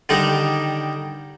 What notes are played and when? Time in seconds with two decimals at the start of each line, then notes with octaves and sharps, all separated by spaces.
0.09 D3 D#3 G3 D#4